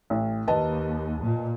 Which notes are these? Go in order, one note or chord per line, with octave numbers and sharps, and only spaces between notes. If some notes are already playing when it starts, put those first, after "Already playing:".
A1
D#2 B4 D#5 A5
A#2